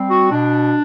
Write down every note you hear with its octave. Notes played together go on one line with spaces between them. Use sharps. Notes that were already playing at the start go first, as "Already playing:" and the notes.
Already playing: G3 C4
F#4
B2 D4